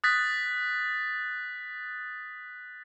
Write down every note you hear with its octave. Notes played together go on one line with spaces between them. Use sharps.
D#6 F#6 A6 B6